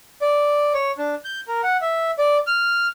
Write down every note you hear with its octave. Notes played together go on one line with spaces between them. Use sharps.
D5
C#5
D4
G6
A#4
F#5
E5
D5
F6